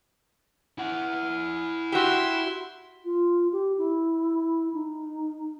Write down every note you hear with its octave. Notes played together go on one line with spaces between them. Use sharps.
E4 F#5
F#4 G4 E5 C6
F4
G4
E4
D#4